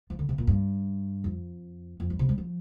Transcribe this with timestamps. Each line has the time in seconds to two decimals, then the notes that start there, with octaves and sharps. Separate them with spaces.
0.10 F3
0.19 D3
0.29 C3
0.38 A#2
0.47 G2
1.24 F2
2.00 F2
2.10 G2
2.19 C3
2.29 G3
2.38 F3